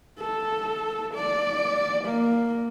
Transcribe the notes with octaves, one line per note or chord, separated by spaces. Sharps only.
A4
D5
A#3